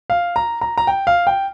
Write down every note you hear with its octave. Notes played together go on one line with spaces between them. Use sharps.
F5
A#5
A#5
A#5
G5
F5
G5